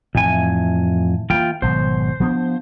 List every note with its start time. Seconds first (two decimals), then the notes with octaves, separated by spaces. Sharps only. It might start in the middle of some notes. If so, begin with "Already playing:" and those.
0.15 F2 A2 E3 G#5
1.30 E3 G#3 A#3 F4 G5
1.62 G#1 B2 F#3 C5
2.20 F3 B3 D4